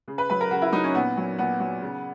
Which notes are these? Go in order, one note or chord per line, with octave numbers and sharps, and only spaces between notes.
C#3
B4
F#3 B4
A#4
C#3 F#4
E4
F#3 D#4
C#4
A#2 B3
F#3
A#2 B3
F#3
C#3